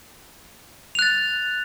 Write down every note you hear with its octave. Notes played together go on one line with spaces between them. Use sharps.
F#6 A6 F7